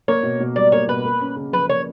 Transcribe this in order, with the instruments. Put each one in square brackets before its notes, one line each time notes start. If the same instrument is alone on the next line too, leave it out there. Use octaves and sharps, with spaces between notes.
[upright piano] A#3 [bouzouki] C#5
[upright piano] B2
B2
[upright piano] G3 [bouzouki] D5
[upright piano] A#3 [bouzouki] C#5
[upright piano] B2 [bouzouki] B4
[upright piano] A#3
C#4
C#3
[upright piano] F3 [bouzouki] B4
[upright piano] A#3 [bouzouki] C#5